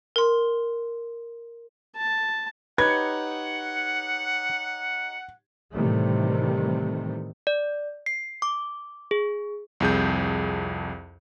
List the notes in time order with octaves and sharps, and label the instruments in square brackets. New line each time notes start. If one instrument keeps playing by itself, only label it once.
[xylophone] A#4 C6
[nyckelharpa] A5
[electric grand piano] D#4 G4 C#5 [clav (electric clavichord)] B4 [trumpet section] F#5 [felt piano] G#6
[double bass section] A2 C3 D#3 E3 G3 A3
[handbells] D5
C7
D6
G#4
[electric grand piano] C2 F2 G#4 G6